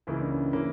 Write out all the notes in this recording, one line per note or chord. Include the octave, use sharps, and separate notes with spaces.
C#2 C#3 E3 A#3
D4
C#4
C#3 E3 A#3 C#4